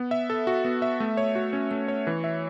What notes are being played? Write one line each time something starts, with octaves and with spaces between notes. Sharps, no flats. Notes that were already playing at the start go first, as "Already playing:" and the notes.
Already playing: B3
E5
A4
F#4
B3
E5
A3
C#5
F#4
C#4
A3
C#5
E3
E5